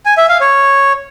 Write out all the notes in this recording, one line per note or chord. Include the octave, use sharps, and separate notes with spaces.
G#5
E5
F5
C#5